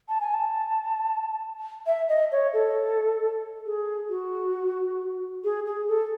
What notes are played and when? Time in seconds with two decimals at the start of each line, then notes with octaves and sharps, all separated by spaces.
0.09 A5
0.21 G#5
0.34 A5
1.86 E5
2.09 D#5
2.32 C#5
2.53 A4
3.66 G#4
4.09 F#4
5.44 G#4
5.66 G#4
5.88 A4